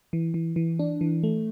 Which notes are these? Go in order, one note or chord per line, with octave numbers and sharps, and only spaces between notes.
E3
E3
E3
D4
E3
A3